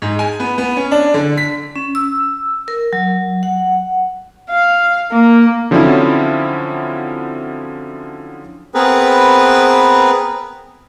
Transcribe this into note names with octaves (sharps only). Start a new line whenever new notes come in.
G#2
G#5
B3
B3
C#4
D4
D3
B6
C#4
E6
A#4
F#3
F#5
F5
A#3
D3 F3 F#3 C4 C#4 E4
B3 C4 G#4 A#4 B4